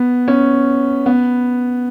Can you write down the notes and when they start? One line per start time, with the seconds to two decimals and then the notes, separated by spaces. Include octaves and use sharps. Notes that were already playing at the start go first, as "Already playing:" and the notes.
Already playing: B3
0.28 C#4
1.06 B3